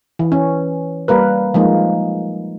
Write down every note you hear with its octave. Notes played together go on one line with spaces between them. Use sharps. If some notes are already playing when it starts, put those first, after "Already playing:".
E3
C#4
G3 A#3 A#4 B4
F3 G#3 A#3 D#4